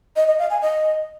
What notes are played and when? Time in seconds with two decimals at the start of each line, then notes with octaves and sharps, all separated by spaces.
0.16 D#5
0.28 D#5
0.39 F5
0.50 G#5
0.61 D#5